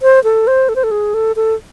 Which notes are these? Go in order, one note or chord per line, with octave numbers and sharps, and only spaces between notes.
C5
A4
C5
A4
C5
A4
G#4
A4
A4